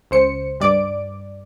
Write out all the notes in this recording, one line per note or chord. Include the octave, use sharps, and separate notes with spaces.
C#2 C5 C#7
G2 D5 D7